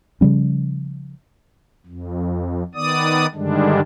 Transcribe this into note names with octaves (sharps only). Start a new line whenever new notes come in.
C#3 F3 G3 C#4
F2
D#3 B3 D5 D#6
G2 D3 D#3 G3 G#3 D4